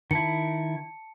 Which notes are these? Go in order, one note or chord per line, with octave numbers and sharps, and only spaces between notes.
D#3 E4 A5 C#7